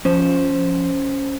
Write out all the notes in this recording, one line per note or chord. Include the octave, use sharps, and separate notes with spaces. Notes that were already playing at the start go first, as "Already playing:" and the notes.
F3 C#4 C5